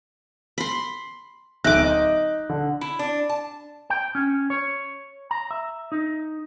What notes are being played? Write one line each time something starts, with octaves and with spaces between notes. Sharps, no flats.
B5 C6
D1 D#4 E5 D6 F#6
D#5
D3
E4
D4
A5
G5
C#4
C#5
A#5
E5
D#4